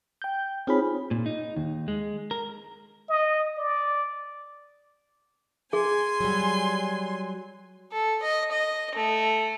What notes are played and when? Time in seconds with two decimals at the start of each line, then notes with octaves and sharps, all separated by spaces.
0.22 G5 G6
0.67 C4 D#4 F4 G#4 C#5 B5
1.11 A#2
1.26 D#4
1.56 D#2
1.88 G#3
2.31 A#4
3.09 D#5
3.58 D5
5.73 G#4 G#5 C6
6.20 F#3 G3
7.92 A4
8.23 D#5
8.52 D#5
8.95 A3